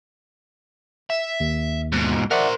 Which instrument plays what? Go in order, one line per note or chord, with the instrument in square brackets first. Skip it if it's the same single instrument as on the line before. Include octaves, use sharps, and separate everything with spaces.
[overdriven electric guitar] E5
[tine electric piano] D#2
[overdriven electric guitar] G#2 B2
[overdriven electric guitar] A#4 C5 [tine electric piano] D5 E5 F#5